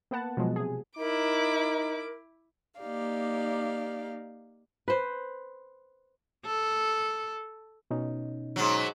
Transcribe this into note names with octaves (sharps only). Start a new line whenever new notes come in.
A#3 B3 B4 F#5 A5
B2 F3 F#3 G#3
C3 G#4
D#4 E4 A#4 D6
A#3 D#4 G4 D5 F5
B4 C5
A4
B2 C#4 D#4
G#2 F#3